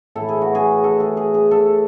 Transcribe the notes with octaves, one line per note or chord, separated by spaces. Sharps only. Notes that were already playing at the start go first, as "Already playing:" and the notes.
A2 E3 A4
G#4
F#4
G#4
A4
G#4
G#4
G#4
A4